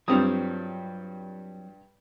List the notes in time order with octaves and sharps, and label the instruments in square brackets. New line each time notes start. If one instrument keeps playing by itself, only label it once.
[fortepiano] G2 G3 D#6 [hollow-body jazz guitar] F#3 C4 F4